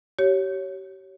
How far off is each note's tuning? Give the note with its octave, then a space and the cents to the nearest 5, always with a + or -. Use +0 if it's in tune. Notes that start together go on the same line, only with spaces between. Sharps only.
G4 -35 C#5 +0